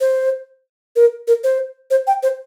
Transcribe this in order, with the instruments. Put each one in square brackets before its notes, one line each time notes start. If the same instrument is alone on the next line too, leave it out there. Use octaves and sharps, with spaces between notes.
[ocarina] C5
A#4
A#4
C5
C5
G5
C5